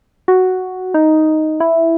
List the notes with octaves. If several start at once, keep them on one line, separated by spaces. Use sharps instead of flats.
F#4
D#4
E4